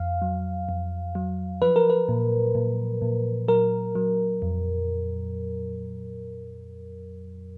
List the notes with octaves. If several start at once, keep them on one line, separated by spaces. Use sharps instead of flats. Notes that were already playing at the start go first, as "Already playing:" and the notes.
Already playing: F2 F5
F#3
F2
F#3
F3 B4
A#4
B4
A#2
A#2
A#2
F#3 A#4
F#3
F2